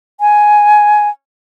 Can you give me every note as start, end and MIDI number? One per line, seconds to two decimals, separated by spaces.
0.20 1.09 80